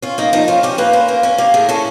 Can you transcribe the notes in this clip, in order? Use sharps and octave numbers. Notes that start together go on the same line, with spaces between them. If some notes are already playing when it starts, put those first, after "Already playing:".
C#4 F4
A#3 D#4
F3 D#4
C#4 F4
C#4 G4
A#3 B4
C#4 C5
A#3
C#4 C#5
A#3 G4
A2 G#4
C#4 A4